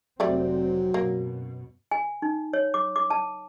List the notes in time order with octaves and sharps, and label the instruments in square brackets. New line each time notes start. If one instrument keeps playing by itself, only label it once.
[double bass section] F1 C3 C4 [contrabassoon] F#3 [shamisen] G3 A3 D5
[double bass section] F#2 B2 [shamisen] A#3
[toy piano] G#5
D#4
C#5
D6
D6
A5